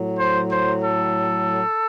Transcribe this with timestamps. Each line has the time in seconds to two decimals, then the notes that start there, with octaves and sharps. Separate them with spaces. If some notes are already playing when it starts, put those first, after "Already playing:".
Already playing: A2 F#3
0.18 C5
0.50 C5
0.83 A4